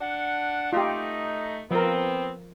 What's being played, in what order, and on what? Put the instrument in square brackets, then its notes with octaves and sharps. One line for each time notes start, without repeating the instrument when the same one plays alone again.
[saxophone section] D4 F#5
[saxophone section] A3 D#4 [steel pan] F4 G4
[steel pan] F3 A#4 [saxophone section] B3 C4